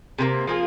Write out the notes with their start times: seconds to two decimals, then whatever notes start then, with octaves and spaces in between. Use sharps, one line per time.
0.18 C3 G3 A#3
0.47 F3 A#3 F4 G#4